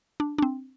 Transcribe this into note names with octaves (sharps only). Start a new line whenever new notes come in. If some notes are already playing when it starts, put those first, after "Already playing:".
D4
D4
C4